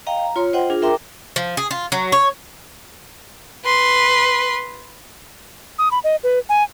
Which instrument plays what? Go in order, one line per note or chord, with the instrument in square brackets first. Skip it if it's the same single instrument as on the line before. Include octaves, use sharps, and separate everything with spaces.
[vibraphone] D#5 F5 G5 A#5
A#5
F4 C#5 C6
F4 C5 D#5 F#5 G5
D4 F4 G#4
A#4 E5 G5 A#5 C6 D6
[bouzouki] F3
G#4
F4
F#3
C#5
[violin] B4 C6
[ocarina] D#6
B5
D#5
B4
G#5